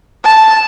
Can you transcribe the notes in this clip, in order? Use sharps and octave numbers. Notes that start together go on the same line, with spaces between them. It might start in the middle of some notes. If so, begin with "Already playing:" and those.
A5